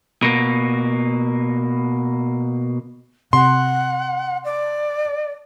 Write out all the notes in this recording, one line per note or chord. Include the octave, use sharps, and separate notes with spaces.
B2 A#3
C3 F#5 C6
D5